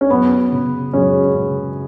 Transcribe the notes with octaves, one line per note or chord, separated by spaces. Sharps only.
C#4
F#2 B3
C#3
F#2 G#3 C#4
C#3